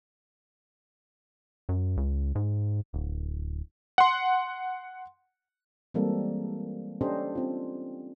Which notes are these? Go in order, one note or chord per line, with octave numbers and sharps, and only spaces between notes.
F#2
C#2
G#2
D1
F#5 C6
E3 G3 G#3 A#3 C4 A4
C#4 D4 G4 A4 C5 D#5
C4 F4